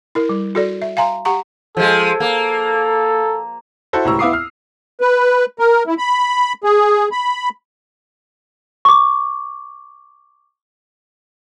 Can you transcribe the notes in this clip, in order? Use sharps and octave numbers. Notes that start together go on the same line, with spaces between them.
E4 A#4
G3
F#4 A4 D5
E5
F5 G#5 A#5 C6
G4 F#5 A#5 C#6
F3 G#3 A4
A#3
E4 F#4 A4 C5
C#2 A2 G3 A#5 C#6 E6
B3 E4 F5 D6 D#6 C7
F6
B4
A#4
E4
B5
G#4
B5
C#6 D6